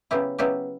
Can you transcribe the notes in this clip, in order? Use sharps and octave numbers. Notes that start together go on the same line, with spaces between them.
C#3 F#3 B3 E4 G4
C#3 F#3 B3 E4 G4